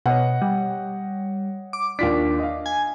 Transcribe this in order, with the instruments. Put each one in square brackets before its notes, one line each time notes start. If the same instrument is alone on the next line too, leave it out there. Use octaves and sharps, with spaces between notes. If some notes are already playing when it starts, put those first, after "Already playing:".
[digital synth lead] B2 [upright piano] C#5 D#5 F#5
[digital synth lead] G3
D6
[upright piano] D#2 F4 B6 [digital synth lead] D4
[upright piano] D#5 F5
[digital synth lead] G#5